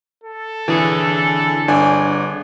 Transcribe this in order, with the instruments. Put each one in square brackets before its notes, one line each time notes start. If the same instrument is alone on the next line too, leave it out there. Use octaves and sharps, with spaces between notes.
[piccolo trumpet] A4
[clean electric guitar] D3 G#4 [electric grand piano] E3
[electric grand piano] G1 D4 G#5